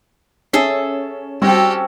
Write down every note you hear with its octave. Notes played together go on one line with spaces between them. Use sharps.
C#4 G#4 A4 E5
G3 C4 C#4 F#4 G4 A4